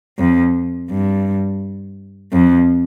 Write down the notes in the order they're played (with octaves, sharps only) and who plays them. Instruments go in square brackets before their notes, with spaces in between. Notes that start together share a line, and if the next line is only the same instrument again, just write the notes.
[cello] F2
G2
F2